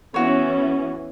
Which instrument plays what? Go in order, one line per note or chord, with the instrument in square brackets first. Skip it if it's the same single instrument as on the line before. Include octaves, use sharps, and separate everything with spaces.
[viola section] E3 B3 C#4 [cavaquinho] F#4 C#5